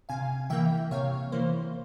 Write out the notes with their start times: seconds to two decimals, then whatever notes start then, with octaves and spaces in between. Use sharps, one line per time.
0.09 C3 F5 G#5
0.50 E3 A#3 E5 G5
0.91 C3 C#5 F5
1.32 E3 A#3 C5